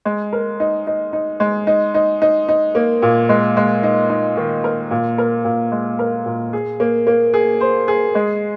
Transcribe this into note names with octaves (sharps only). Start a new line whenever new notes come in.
G#3
A#4
D#4
D#4
D#4
G#3
D#4
D#4
D#4
D#4
A#3
A#2
G#3
G#3
D#4
D#4
D#3
A#4
A#2
A#4
A#2
G#3
A#4
A#2
G#4
A#3
A#3
G#4
C5
G#4
G#3